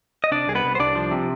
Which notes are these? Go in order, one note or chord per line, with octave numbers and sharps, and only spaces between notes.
D#5
C3 D4 D5
C2 G#4
B3 B4
C2
C5
C2 D4 D5
F3
C3